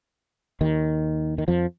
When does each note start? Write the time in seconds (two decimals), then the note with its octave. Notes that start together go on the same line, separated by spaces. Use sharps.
0.61 D#2 D#3
1.38 D#3
1.48 F2 F3